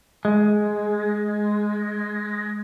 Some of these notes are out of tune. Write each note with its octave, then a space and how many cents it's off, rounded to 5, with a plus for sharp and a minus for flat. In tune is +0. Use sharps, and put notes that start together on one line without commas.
G#3 +10